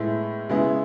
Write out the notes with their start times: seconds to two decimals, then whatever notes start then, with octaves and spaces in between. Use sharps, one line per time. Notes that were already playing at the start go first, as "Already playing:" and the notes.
Already playing: A2 G#3 B3 E4
0.49 C#3 G#3 B3 E4 G#4